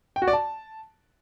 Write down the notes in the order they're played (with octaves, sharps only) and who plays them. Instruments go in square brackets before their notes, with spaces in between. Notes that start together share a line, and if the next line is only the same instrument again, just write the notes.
[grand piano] G5
F#4
D5
A5